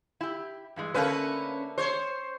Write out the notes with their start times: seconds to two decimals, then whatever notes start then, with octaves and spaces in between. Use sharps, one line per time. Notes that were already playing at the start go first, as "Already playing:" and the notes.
0.21 E4 G4
0.76 G2 E3 G#3
0.94 D3 A3 A#3 C#4 B4
1.78 C5 C#5